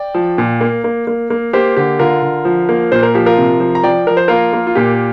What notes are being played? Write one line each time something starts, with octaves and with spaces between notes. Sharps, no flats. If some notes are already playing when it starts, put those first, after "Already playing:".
Already playing: D5 G5
F3
A#2
A#3
A#3
A#3
A#3
A#3 G4 C5
D3 G4
D3 F4 A#4
D3
F3
A#3
A#2 C5
A#4
F3 G4
F4 A#4
C3
F3
A#5
F3 D5 G5
F3 A#4
C5
A#3 F4 A#4
A#3
F4
A#2 G4